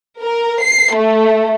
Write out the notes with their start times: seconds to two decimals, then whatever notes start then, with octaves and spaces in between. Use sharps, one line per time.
0.21 A#4
0.62 C7
0.95 A3